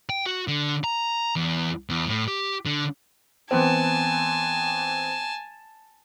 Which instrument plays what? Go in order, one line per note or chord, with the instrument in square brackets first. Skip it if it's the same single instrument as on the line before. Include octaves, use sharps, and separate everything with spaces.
[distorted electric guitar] G5
F#4
D3
A#5
E2
E2
A2
G4
D3
[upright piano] E3 B3 C4 [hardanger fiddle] G#5 A5